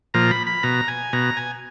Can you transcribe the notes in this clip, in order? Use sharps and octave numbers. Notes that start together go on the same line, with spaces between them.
A#2 F3 A#5
B5
B5
B2 A#5
G#5
B2 A#5
G#5